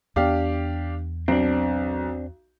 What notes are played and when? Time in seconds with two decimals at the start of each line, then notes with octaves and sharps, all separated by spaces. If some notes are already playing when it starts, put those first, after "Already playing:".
0.16 E2 B3 D4 G4 F5
1.28 B1 C4 D4